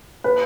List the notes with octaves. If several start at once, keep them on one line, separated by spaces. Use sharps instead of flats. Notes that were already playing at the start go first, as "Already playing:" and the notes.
B4